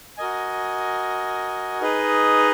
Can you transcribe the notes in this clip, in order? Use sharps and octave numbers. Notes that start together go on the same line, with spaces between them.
F#4 A#4 D#5 G#5
D#4 G#4 B4 D#5